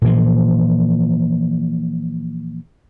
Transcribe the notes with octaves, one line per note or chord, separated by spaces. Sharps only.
A#2 E3 F3